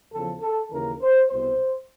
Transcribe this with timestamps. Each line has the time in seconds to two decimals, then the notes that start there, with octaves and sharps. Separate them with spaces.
0.12 E2 C#3 F3 A4
0.41 A4
0.71 D#2 C#3 E3 A#4
1.00 C5
1.29 C2 B2 C5